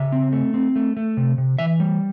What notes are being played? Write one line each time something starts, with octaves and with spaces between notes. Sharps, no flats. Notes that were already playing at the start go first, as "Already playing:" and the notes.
Already playing: C#3 E5
C4
A3
C4
A3
A3
C3
C3
E3 E5
G3